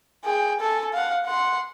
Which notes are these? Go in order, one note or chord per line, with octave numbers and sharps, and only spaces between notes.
G#4 G5
A4 G#5
F5 F#5
F#5 C6